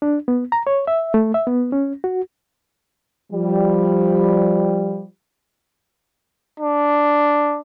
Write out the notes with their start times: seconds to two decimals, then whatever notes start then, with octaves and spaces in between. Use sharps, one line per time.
0.02 D4
0.28 B3
0.52 A#5
0.67 C#5
0.87 E5
1.14 A3
1.34 E5
1.47 B3
1.72 C#4
2.04 F#4
3.32 F3 G3
6.60 D4